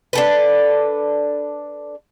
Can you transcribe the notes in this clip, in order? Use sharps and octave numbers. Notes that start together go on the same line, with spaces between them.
D4 A4 B4